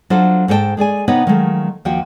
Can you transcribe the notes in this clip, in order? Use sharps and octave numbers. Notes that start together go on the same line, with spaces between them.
F#3 D4 F4 A4 C5
G#2 A4 C5 C#5 G5 A5
G#3 G#4 D5 G#5
C3 B3 D#4 B4 C#5 D#5
D#3 F3 F#3 G#3 A3
D#2 F3 F4 F#4 G5